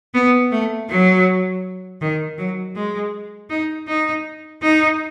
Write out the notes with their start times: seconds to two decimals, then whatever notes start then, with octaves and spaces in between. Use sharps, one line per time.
0.14 B3
0.52 A3
0.89 F#3
2.01 D#3
2.38 F#3
2.76 G#3
3.50 D#4
3.88 D#4
4.62 D#4